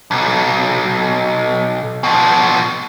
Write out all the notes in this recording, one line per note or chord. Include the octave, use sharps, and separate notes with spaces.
B1
B2 F3